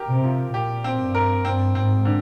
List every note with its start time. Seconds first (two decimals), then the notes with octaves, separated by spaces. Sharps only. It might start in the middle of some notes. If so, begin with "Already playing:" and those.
Already playing: G4 A#4
0.08 C3
0.24 F3
0.53 A#2 G4
0.84 C4
1.00 G2
1.15 A#4
1.44 G2 C4
1.75 G#2 C4
2.05 D3